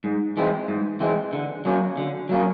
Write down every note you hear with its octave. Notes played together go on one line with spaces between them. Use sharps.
G#2
E3 G#3 C4
G#2
E3 G#3 C4
D3
F#3 A#3 C#4
D3
F#3 A#3 C#4